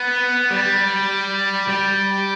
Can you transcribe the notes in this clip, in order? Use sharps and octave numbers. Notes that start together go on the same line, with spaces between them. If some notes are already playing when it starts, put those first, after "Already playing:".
Already playing: B3
G3
G3